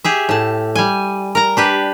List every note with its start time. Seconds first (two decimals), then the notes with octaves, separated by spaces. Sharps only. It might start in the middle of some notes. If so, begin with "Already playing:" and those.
0.04 G4 G#4 E5
0.29 A2 A5
0.76 G3 G#5
1.35 A#4 A#5
1.57 D4 G4 B4